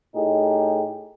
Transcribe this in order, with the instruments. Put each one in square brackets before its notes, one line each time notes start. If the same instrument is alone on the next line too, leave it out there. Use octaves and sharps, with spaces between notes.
[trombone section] A2 D#4 G4 G#4